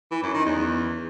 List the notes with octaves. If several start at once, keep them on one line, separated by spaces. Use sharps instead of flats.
E3
F#2
D#3
E2